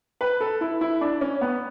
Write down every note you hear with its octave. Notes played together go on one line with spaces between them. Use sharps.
B4
A4
E4
E4
D4
C#4
B3